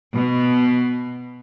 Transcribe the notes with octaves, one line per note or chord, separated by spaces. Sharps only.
B2